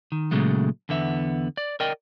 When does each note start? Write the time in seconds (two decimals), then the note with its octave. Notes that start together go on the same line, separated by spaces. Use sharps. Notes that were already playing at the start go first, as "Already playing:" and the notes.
0.12 D#3
0.31 A#2 C#3 F#3 G#3 A3
0.89 E2 D3 B3 E5
1.57 D5
1.80 A#4 D5 D#5 G5